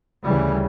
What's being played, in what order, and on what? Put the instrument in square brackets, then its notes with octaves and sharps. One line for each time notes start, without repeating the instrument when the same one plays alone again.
[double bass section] D2 C#3 E3 G3